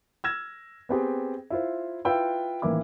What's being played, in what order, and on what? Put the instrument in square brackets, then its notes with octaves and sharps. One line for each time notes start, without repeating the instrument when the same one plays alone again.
[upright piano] E6 F6 G#6 A#6 E7
B3 C4 G4 G#4
E4 F4 C5
E4 F4 B4 G5 E6
A1 D#3 E3 A#3 E4 D6